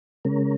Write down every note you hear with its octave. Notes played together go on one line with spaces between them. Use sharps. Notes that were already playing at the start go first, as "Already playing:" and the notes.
C#3 G#3 C#4 A#4